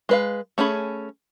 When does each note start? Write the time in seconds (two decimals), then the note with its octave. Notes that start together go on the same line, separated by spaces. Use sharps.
0.09 G#3 B4 F5
0.58 A3 C#4 G#4 B5